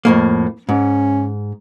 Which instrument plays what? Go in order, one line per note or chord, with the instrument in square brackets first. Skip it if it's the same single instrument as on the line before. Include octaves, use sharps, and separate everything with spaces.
[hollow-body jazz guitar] F2 A2 A#3
[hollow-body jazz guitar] G#2 [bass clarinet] C#4